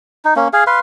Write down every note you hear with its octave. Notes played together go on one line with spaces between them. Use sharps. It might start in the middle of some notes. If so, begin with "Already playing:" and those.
D#4
A#3 C#4
G#4 F5
B4 F5 C6